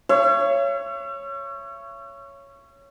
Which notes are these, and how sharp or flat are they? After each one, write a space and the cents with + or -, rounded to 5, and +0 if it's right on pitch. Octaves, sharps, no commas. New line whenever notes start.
C#5 +0 E5 +45